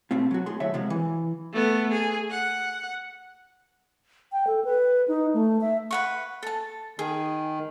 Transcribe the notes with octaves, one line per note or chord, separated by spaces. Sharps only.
B2 A3 C4 F4
F#3 F#4
A2 G#4 C6
D#2 A2 F#3 C#5 E5
C3 F3 F#3 G#3
E3
A3 B3
G#4
F#5
G5
A4
B4
D#4
A3
E5
B4 F#5 C#6
A4 A5
D#3 G#4